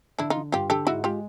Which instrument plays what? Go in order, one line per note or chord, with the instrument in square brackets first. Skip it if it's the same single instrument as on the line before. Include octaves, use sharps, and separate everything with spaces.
[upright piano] D3 [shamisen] D4 E4
[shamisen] D#4 F4
[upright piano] D3
[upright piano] G2 [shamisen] F4 G4
[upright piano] D3 [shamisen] G4 A4
[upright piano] G#2 [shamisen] E4 F#4
[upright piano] G#3 [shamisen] F4 G4